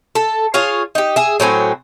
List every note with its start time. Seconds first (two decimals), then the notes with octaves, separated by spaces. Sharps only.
0.15 A4
0.54 F4 G#4 C#5 F5
0.95 D#4 G4
1.16 G#4 E5
1.40 A2 F#3 C4 G#5